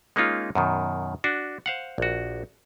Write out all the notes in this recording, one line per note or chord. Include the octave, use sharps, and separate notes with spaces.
G#3 A#3 C#4 D#4 F4
F#2 B2 D#3
D4 F#4
C5 F5 F#5
A#1 F#4